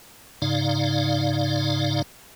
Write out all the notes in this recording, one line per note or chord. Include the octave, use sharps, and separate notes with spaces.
G#2 C#3 D#4 D5 F5